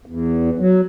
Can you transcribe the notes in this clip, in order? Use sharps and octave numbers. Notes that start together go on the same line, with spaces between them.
E2
F#3